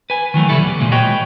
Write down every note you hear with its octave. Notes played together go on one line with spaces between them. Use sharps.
B4 G#5
D#3 E3 F#3 A3
C#3 G3 E4 A4
E2
A#2 G#3
F#4 B4 C#5 D#5 G5